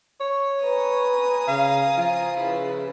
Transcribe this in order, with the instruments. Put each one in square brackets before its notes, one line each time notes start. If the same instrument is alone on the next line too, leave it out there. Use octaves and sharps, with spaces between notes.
[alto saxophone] C#5
[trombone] B4 [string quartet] G#5 A#5 D#6
[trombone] C#3 [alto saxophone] F5
[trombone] F3 [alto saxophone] F4
[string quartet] C#3 E4 B4